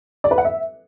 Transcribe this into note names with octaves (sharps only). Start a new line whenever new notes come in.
D5
B4
F#5
E5